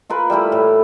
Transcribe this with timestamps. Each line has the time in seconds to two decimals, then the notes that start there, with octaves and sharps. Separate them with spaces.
0.09 F4 A#4 B4 G#5
0.30 G3 A3 E4 G4
0.52 A2